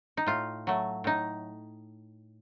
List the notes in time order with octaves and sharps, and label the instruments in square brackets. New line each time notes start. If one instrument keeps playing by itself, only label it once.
[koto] D#4
A2 F4
F#3 A3
A2 D#4